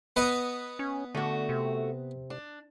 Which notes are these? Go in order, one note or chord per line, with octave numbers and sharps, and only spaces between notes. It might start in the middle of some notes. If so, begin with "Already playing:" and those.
B3 B4 D#5
C#4
D3 A3 F#4
C3
D4